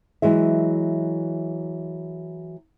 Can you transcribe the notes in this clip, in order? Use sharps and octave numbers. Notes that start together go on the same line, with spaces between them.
E3 F#3 G#3 E5